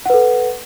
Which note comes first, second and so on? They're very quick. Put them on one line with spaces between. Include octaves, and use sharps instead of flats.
F#5 B4 A4